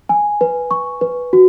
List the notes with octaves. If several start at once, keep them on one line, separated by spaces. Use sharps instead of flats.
G#5
B4
C#6
B4
F#4